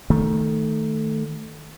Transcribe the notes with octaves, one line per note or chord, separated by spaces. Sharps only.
D#3 A3